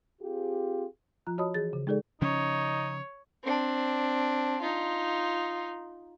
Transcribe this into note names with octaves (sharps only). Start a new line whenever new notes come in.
C4 F4 G4 G#4
F3 F4 A#5 F#6
F#4 C#5 D#5 A5 B5 D#6
E3 G#4 A6
C#3
G#3 D#4 G#4 A4 D5
C#3 F3 C#4 D#4 C#5
C4 D4
D#4 F4